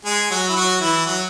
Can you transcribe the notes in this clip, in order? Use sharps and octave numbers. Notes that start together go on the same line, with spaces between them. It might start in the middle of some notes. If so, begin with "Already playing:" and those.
G#3 G#4
F#3 F#4
E4
F#3 F#4
E3 E4
F#3 F#4